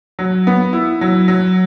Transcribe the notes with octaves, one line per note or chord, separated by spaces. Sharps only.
F#3
B3
E4
F#3
F#3